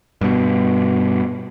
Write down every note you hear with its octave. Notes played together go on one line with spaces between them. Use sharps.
G2 B2